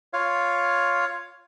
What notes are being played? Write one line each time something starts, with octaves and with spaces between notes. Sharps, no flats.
F4 C#5 F5